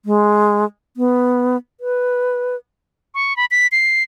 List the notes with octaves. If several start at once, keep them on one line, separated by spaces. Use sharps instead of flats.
G#3
B3
B4
C#6
B5
B6
C7